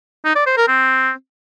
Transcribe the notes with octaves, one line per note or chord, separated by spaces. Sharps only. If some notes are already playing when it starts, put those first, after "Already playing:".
D#4
D5
C5
A#4
C4